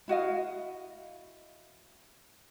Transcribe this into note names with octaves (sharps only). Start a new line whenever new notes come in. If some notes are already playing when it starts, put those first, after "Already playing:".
E4 F#4 D#5 F5